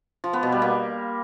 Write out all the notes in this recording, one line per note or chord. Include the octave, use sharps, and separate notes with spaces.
F3
B3
B2
G3
A#3